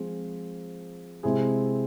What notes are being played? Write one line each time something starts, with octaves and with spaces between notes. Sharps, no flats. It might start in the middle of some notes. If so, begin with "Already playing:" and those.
Already playing: F3 G#3 C4 F4 G#4
C3 G#3 C4 E4 G#4